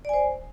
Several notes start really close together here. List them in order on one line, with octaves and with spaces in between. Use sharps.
D5 G#5 C5